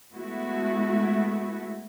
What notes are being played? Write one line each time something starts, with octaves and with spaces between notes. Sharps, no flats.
G#3 A3 B3 E4 F#4